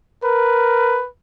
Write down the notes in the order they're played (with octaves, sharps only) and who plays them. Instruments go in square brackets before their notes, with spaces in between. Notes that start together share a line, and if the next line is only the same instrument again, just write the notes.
[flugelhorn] A#4 [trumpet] B4